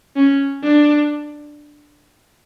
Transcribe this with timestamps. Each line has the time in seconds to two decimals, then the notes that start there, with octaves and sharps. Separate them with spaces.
0.16 C#4
0.64 D4